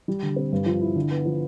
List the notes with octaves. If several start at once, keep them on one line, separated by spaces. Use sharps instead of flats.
G3
D3
C4
G2
F3
E4
D3
B3
F3